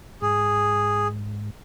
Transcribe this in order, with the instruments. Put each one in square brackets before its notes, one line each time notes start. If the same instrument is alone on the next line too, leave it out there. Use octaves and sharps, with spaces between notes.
[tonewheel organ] G#2 [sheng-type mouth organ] G#4